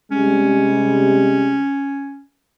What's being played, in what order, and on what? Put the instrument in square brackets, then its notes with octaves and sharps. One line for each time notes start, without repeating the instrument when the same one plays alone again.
[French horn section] C3 G3 G#3 [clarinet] C#4